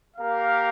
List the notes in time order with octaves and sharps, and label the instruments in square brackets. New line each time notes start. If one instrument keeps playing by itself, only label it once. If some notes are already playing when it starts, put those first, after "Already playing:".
[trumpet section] A#3 G4 A#4 F5